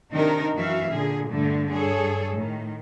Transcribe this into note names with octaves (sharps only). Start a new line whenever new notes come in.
C3 D#3 D4 D#4 A#4
F#2 E3 F#4 E5 F5
A#2 D3 G#4
G2 D3 A3
G2 G#4 A4 C#5
A2 D#3